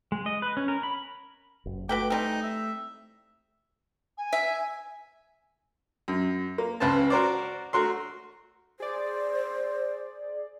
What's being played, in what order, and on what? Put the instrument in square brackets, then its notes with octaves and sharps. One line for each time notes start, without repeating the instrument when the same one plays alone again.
[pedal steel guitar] G#3
D#5
B4
C#4
A#4
B5
[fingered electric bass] F#1
[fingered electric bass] A3 [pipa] F#4 B4 G5 [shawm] D6
[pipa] E3 G3 C4 [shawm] D#4
[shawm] E5
[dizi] G#5
[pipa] E5
[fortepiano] F#2
A#3
C#2 C#3 B4 C5 A5
F#4 A#4 C5 D5
A3 F#4 A#4 C6
[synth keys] G#4 D5 [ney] C5